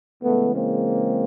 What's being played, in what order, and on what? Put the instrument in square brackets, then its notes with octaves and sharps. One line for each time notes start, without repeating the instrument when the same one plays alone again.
[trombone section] C#3 E3 G#3 A3 B3
A#3 C4